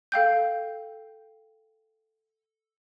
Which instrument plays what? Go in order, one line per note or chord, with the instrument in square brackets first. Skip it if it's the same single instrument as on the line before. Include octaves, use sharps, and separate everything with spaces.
[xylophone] A4 F5 G5 G6